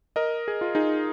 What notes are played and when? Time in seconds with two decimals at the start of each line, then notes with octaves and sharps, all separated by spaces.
0.16 A#4 D#5
0.48 G#4
0.61 F4
0.75 D#4 G#4